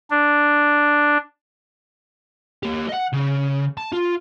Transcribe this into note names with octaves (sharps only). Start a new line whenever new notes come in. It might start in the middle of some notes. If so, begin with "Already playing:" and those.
D4
A#3 G4
D#5 F#5
C#3
A5
F4